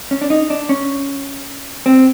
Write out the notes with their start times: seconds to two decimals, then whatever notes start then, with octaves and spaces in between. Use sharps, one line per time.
0.11 C#4
0.21 D4
0.30 D#4
0.50 D4
0.69 C#4
1.86 C4